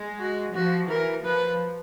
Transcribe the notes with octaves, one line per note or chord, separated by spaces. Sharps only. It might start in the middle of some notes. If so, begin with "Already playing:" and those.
Already playing: G#3
F#4
F3 F#4
E3 A#4
F3 B4